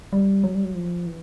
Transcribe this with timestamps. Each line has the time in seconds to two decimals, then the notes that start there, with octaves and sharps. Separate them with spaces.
0.13 G3
0.44 F#3
0.55 G3
0.64 F#3
0.75 F3
1.06 E3